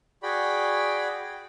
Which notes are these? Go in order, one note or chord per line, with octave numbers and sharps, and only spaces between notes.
F#4 G#4 D5 G5 B5